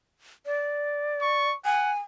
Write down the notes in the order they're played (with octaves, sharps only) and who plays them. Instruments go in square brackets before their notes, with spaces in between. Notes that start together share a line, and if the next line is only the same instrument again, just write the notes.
[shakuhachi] D5
[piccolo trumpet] C#6
[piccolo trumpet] F#5 [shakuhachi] G#5